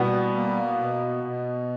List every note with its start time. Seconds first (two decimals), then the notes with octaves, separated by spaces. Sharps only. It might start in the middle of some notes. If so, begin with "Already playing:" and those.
Already playing: B2 G3 B3
0.35 A#3
0.79 B2
1.24 B2